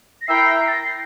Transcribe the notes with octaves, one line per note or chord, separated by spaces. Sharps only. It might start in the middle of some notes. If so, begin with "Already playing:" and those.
A#6
E4 A#4 E5 G5 C7
C7
A6
A#6
C7